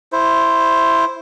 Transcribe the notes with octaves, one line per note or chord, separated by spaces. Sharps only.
E4 C5